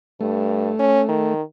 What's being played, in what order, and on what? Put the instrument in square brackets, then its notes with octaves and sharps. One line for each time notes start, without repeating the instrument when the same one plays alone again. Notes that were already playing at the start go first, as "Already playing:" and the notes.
[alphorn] G2 [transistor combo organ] A3
[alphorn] C#4
D#3